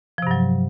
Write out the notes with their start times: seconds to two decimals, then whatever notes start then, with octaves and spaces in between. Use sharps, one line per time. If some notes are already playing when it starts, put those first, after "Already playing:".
0.18 F3
0.22 C3
0.27 G2
0.31 F#3